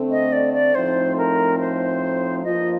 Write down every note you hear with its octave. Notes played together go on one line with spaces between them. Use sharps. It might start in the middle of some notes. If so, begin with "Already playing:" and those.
Already playing: D3 A3 C4
D#5
D5
D5
A2 F3 A3 C4 D#4 C5
A#4
C5
G2 F3 A#3 F4 D#5